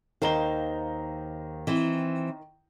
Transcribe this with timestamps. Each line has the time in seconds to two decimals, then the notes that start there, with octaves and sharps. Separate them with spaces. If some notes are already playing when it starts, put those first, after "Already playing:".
0.22 D#2 D#3 C5 F5 A#5 G7
1.67 E3 C4